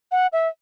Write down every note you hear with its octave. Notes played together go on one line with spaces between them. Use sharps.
F#5
E5